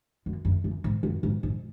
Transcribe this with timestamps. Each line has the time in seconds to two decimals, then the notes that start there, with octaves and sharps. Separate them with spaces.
0.26 F#2
0.45 F#2
0.64 F#2
0.84 G#2
1.03 F#2
1.23 G#2
1.43 G#2